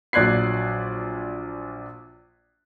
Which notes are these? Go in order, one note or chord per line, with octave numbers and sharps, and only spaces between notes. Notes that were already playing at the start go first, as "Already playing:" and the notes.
A#1 F#3 D5 F#6 G#6 C7